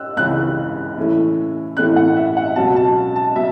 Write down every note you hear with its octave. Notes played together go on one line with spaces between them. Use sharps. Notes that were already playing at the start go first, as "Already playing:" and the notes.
Already playing: C#4 E6 F#6
C#2 C#3 E3 C#4 F#6
A2 E3 A3 C#4
A2 E3 A3 C#4 F#6
F#5
E5
F#5
C#2 B2 F#3 C#4 A5
A5
A5
B2 F#3 E5